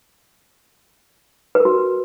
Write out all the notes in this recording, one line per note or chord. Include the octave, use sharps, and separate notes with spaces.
B4
A#4
F#4